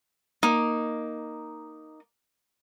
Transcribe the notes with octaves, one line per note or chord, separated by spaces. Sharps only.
A#3 D#4